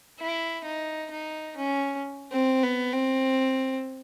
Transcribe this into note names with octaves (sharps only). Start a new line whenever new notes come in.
E4
D#4
D#4
C#4
C4
B3
C4